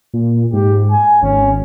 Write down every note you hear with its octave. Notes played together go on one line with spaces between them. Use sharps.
A#2
G#2 G4
G#5
G#1 C#4